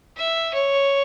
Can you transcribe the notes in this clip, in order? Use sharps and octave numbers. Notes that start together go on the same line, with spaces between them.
E5
C#5